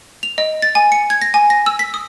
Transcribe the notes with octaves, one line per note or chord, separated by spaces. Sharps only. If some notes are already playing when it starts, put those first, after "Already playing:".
F7
D#5
A6
G#5
C#7
G#6
A#6
G#5
A#6
E6
B6
D#6